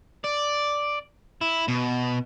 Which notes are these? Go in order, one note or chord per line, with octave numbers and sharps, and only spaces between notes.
D5
E4
B2